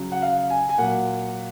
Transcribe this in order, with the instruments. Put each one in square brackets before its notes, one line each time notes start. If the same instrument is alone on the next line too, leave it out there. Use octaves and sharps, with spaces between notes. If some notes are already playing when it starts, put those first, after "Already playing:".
Already playing: [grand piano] C#3 F#3
F#5
F5
G#5
G#5
A#2 F#3 F#5